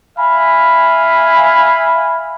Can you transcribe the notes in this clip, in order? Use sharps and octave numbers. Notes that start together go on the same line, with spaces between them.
E5 F5 G#5 B5